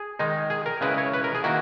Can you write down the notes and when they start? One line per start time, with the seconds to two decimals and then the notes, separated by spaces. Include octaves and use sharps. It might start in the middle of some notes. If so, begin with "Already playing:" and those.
Already playing: G#4
0.19 D#3 G#3 D#4
0.50 G#4
0.66 A#4
0.81 C#3 G#3 C#4 E4 B4
0.98 C#5
1.13 B4
1.24 A#4
1.35 G#4
1.44 D#3 A#3 E4 F#4